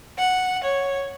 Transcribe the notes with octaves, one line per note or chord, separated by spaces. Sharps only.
F#5
C#5